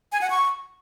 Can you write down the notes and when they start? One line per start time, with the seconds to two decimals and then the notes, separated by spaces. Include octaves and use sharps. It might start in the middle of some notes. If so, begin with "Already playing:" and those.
0.12 G#5
0.21 F#5
0.30 C#6